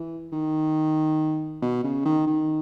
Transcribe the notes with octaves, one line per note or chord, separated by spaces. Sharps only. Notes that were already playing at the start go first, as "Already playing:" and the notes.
Already playing: E3
D#3
B2
C#3
D#3
D#3